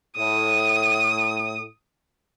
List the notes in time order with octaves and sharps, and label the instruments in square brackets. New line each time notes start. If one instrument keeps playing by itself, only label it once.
[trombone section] A2 [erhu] D#6